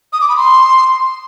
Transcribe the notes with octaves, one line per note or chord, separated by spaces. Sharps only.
D#6
D6
B5
C6